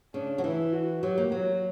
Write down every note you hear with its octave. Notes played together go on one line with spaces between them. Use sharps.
C#3 D4
F#3
E3 E4
F#4
F#3 G4
A#3
F#3 F#4